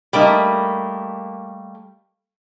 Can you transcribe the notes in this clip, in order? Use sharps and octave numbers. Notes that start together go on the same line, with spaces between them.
G3 A3 A#3 D#4